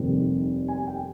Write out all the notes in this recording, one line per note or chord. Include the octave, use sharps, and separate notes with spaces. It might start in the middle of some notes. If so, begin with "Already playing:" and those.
Already playing: F1 D#2 D#3 G3 C4
G#5
G5